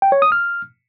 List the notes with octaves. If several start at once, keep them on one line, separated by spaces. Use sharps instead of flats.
G5
C#5
D#6
F6